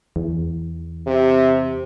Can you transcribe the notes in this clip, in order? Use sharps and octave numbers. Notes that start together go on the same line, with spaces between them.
E2
C3